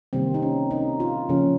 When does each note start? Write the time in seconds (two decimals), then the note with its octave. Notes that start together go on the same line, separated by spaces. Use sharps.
0.13 C3 D#3 G3 A#3 C4
0.34 D#4
0.42 C#4
0.71 D#4
1.00 F4
1.29 C#3 F3 A#3 C#4